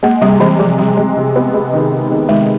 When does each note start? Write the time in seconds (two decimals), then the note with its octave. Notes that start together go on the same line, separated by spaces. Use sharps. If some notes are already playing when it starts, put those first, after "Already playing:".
0.03 G#3 A#3
0.21 C3 G3
0.40 E3 G#3
0.59 F3 G#3
0.78 C3 G3
0.97 G#3
1.17 C3
1.36 B3
1.54 G#3
1.73 D#3
1.91 C3
2.11 D#3
2.29 D#3 G#3